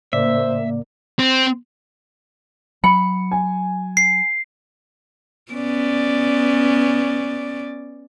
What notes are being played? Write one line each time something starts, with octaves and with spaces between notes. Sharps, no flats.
A2 C#3 A#3 C5 D5 E5
C4
F#3 B5 C#7
G#5
C7
B3 C#4 D5